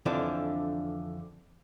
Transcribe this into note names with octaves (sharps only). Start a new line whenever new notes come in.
F2 D3 E3 F3 D4